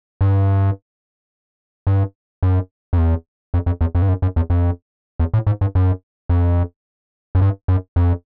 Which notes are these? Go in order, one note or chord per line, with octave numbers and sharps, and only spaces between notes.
G2
G2
F#2
F2
E2
F2
F2
E2
F2
G2
F#2
F#2
E2
F2
E2
A2
G#2
G2
F#2
F2
F#2
G2
F#2
F2